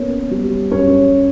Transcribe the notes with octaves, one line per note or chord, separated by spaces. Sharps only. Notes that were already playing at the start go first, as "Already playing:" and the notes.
Already playing: A#3 B3 C#4
G3
F#2 C#4 C#5